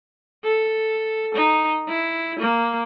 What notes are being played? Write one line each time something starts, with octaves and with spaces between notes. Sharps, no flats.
A4
D#4
E4
A#3